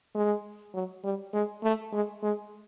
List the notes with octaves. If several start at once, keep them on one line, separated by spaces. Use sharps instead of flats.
G#3
F#3
G3
G#3
A3
G#3
G#3